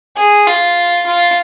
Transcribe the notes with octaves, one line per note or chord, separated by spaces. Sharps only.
G#4
F4
F4